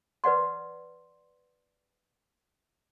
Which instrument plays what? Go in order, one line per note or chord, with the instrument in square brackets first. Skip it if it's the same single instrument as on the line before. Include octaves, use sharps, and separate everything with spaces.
[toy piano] B4 D5 F#5 C6